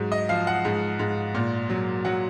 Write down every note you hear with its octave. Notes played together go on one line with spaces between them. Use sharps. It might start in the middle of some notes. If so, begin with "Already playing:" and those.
Already playing: G#2 F#3
D#5
F3 F5
F#5
G#2
G#2
A#2
F#3
F#3 F#5